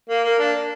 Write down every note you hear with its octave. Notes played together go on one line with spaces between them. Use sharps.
A#3
A#3
D4